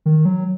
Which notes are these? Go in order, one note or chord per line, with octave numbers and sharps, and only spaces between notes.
D#3
F#3